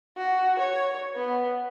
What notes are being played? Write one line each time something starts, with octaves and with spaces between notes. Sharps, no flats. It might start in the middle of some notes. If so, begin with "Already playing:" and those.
F#4
C#5
B3